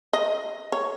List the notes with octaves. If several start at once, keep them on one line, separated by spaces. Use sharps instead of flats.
D#5
C#5